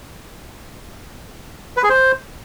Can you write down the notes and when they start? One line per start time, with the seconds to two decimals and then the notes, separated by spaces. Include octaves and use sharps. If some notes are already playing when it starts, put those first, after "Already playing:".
1.77 B4
1.83 G#4
1.89 C5